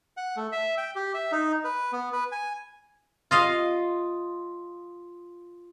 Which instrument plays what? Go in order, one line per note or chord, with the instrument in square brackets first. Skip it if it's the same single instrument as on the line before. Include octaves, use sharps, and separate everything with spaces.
[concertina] F#5
A3
E5
G5
G4
E5
D#4
B4
B3
B4
G#5
[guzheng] F4 D#5 F5